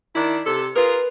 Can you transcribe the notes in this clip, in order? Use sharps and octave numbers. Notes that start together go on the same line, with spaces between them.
D#3 D4 E4
C3 A4
F4 G#4 A#4 B4